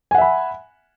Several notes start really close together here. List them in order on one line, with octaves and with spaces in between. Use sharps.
G#5 F#5 E5 B5